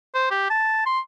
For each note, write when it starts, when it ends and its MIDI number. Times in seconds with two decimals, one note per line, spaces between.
0.14 0.30 72
0.31 0.46 67
0.50 0.83 81
0.86 0.99 84